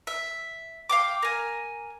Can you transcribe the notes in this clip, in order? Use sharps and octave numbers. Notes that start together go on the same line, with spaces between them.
E5
F5 G5 D6
A#4 G#5